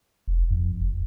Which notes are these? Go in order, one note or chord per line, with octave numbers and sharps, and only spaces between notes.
F1
F2
F#1